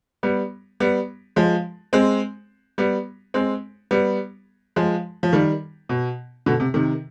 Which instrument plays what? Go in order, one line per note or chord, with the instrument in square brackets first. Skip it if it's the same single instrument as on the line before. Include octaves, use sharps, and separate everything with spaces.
[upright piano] G3 B3
G3 B3
F3 G#3
G#3 C4
G3 B3
G#3 C4
G3 B3
F3 G#3
F3
D#3 G3
B2
B2 D3
C3
C3 D#3